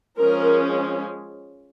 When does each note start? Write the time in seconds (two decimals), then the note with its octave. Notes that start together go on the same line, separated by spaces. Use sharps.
0.19 F3 G#3 C#4 A#4